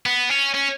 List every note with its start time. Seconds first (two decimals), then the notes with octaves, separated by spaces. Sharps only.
0.06 B3
0.30 C#4
0.54 C#4